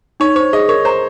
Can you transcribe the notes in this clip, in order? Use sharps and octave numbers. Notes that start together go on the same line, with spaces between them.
D#4 C#5
C5 C#5
G#4 D#5
A#4 C#5
C5 A#5